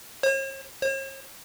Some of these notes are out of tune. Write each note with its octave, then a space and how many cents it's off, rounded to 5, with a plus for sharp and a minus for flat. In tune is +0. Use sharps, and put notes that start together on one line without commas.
C#5 -45
C#5 -45